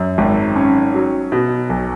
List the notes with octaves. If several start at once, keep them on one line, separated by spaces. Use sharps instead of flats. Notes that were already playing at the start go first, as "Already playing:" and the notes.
Already playing: F#2
G#1
C#4
F#3
B2
B1